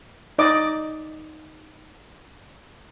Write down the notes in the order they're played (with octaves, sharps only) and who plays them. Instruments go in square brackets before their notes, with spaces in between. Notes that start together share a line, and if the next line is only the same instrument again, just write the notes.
[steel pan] D#4 D5 D#5 D6